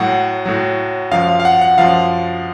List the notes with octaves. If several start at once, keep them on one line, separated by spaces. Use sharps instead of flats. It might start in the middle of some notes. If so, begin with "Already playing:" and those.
Already playing: A2 F#3 F#5
A2 F#3
F#2 F3 F5
F5
F5
F#5
F#5
F#2 F3 F5